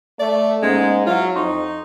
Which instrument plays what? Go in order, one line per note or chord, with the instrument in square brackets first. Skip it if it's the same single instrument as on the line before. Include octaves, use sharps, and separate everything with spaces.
[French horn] A3 [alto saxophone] D5
[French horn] G#2 [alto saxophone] G#3 [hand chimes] A#3 B3 C#4
[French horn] F#3 [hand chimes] E4 E5 [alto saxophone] F4
[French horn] F2 [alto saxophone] D#4 [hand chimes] C6 C#6